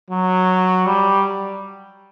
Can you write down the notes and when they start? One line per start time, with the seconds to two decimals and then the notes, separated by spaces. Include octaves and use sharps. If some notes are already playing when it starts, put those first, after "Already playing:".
0.10 F#3
0.86 G3